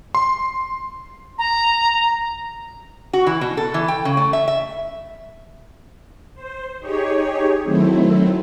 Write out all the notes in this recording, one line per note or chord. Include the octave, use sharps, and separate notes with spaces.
C6
A#5
F#4
E3
B2
A4
E3
G5
C#3
A3
E5
E5
C5
D#4 G4 G#4 C#5
D#3 F#3 A3 C4 E4